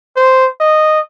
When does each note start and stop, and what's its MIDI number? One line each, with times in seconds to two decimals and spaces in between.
0.17 0.48 72
0.60 1.00 75